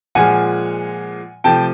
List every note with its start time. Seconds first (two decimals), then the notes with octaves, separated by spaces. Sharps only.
0.15 A#2 F3 G#3 F#5 G#5
1.44 C3 F3 A3 G5 A5